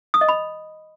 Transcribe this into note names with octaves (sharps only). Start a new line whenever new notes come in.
D#6
D#5
B5